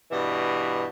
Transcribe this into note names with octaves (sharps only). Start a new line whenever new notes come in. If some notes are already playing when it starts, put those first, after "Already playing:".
G2 B2 E3 G3